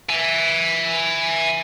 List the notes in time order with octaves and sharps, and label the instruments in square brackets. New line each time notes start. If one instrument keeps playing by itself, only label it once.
[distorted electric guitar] E5 G#5